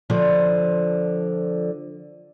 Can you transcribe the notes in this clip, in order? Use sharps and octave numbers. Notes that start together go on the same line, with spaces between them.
D3 F3